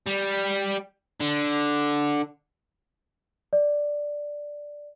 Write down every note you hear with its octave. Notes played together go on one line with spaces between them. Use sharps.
G3
D3
D5